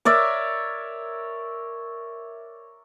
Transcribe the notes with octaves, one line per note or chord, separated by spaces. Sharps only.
A#4 C#5 D5 E5